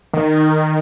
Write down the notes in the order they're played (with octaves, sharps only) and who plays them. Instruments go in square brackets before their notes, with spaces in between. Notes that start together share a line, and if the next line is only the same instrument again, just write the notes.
[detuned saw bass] D#3